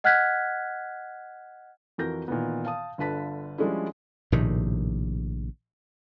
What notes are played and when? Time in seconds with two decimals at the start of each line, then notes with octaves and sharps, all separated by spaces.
0.04 D#5 F#5 F6 F#6 G#6 B6
1.98 F2 E3 F#4 A#4 G6 A#6
2.28 A#2 D#3 E3 B3
2.65 F5 A5 D#6
2.98 G1 D3 F4 B4 A5 B6
3.58 F3 G3 G#3 C#4 D4 E4
4.32 A#1 A2 C3 D#3